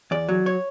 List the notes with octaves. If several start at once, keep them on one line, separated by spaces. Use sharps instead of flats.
E2 D5
F#3
C#5